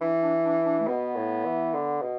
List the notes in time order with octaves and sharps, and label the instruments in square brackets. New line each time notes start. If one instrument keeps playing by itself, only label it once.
[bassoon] E3 [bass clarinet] D4
[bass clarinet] D4
D4
D4
A3
[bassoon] B2 [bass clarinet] B3
[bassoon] A2
E3
D3
B2